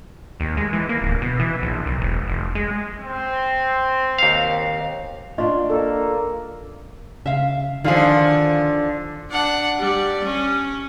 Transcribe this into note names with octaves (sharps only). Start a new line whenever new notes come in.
D#2
G#3
E3
A#3
D1
B2
E3
A#1
B1
E1
F1
G#3
C4
D#2 F5
D4 F4 D#5 C#6
A#3 A4
C#3 E5 F5
D3 D#3 F3 F4 F5 G#5
D4 F#5
G3 D5
C#4